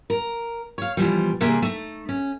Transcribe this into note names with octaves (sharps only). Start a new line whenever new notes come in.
A#4
C#5 F5
B2 E3 F3 G3
C3 E3 G3 A#3 G#4 E5
A3 D#4
C#4